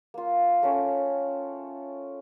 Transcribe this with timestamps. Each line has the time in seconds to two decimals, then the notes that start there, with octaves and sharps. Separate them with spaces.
0.14 A#3 F4
0.62 A3 C#4 G5